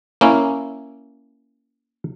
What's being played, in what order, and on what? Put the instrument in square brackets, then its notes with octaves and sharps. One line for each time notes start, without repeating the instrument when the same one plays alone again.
[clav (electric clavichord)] A#3 C#4 E4